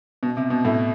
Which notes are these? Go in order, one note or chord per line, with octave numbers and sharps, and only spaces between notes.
B2
C3
B2
A2